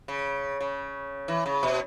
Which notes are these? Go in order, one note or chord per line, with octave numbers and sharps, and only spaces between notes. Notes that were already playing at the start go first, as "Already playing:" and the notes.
C#3
C#3
E3
C#3
B2